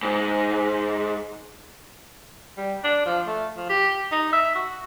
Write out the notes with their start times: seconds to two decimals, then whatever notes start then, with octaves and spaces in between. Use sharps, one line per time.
0.03 G#2
2.57 G3
2.84 D4
3.06 F3
3.27 A3
3.56 F3
3.69 G4
4.12 D#4
4.33 E5
4.55 F#4